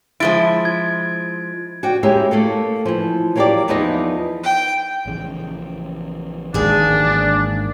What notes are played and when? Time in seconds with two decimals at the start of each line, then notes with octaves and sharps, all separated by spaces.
0.20 F3 G#3 E4 A6 D7
0.65 G#6
1.83 F#4 D5 G5
2.03 G#3 A#3 C#4 E4 G4
2.31 A3 A#3 A4
2.85 E3 F3
3.36 F#3 A#3 B3 G4 A#4 D5
3.68 E2 F3 B3 D#4 E4 D#5
4.43 G5
5.06 A#1 C#3 E3
6.54 G#1 G#2 A#3 D4 G#4